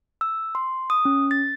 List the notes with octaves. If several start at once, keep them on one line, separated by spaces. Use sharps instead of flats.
E6
C6
D#6
C#4
A6